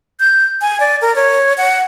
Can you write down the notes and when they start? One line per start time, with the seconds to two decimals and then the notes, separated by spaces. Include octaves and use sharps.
0.20 G6
0.61 G#5
0.80 D5
1.02 A#4
1.15 C#5
1.58 F#5